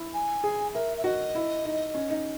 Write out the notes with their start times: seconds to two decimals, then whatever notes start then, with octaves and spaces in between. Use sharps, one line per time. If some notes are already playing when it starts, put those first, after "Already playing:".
Already playing: E4
0.14 G#5
0.44 G#4
0.74 A#4 E5
0.97 E5
1.04 F#4 D#5
1.35 E4
1.65 D#4
1.94 C#4
2.10 D#4